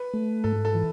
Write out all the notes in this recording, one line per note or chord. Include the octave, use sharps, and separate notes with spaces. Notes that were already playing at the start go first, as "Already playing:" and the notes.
Already playing: B4
A3
G#2 A4
A4
E3